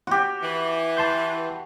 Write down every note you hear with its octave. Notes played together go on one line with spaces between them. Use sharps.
F#4 G4
E3
A5 C6 G6